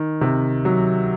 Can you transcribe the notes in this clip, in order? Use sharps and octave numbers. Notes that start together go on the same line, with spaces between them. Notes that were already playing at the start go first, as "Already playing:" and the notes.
Already playing: D#3
C3
F#3